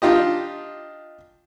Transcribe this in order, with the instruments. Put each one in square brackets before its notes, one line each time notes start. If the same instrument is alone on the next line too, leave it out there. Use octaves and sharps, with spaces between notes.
[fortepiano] D4 D#4 F4 G4 D#5